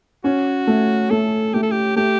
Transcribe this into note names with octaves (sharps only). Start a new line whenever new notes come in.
C#4 F#4
A3
A3 A4
A3 G4
A4
G4
A3 G4